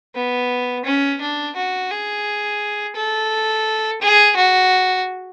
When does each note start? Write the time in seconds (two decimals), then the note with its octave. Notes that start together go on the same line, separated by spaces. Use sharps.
0.15 B3
0.85 C#4
1.21 D4
1.56 F#4
1.91 G#4
2.96 A4
4.01 G#4
4.36 F#4